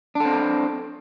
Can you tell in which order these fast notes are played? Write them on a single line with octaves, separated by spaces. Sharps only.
D4 A4 C4